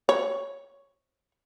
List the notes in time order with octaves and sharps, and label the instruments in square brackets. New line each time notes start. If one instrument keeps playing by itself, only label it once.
[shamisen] C#5